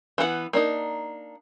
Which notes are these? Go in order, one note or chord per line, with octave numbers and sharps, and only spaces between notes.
E3 B3 F#4 F#5
A#3 D4 D#4